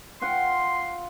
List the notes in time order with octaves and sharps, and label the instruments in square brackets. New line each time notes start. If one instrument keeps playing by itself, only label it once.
[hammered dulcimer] F4 F#5 G5 [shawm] C6